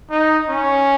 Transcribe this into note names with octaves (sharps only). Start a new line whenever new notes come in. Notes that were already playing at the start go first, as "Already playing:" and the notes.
D#4
C#4